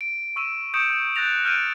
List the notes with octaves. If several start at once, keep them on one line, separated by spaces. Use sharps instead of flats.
D7
C#6 E6 D#7 E7
C#6 D#6 G6 C#7 D7 E7
F#6 G6 A6 A#6 F7
F6 G6 A#6 D7 D#7